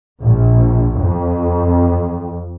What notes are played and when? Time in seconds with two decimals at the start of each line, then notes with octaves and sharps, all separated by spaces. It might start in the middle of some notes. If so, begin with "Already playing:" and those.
0.21 A#1
1.00 F2